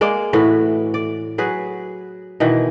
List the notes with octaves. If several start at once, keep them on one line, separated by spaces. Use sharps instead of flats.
G#3 A#3 D5
A2 E3 F#4 B4
D5
F#3 G#4 B4
B2 D#3 E3